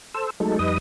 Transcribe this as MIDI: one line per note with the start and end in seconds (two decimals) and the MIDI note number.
0.14 0.30 69
0.14 0.30 72
0.14 0.30 88
0.40 0.59 54
0.40 0.59 56
0.40 0.59 57
0.40 0.59 63
0.40 0.59 69
0.59 0.78 41
0.59 0.78 55
0.59 0.78 63
0.59 0.78 71
0.59 0.78 75
0.59 0.78 87